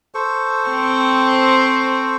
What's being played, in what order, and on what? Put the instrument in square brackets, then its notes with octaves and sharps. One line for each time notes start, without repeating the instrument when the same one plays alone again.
[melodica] A4 C5 C#6
[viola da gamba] C4